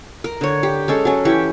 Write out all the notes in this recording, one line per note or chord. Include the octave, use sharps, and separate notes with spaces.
A#4
D3 C#5
G4
G#3 C#4 A4
F#3 C#4
E3 G4 C#6